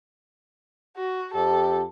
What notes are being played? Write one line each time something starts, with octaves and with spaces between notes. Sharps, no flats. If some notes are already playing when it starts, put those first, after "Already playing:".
F#4
F2 G4 A4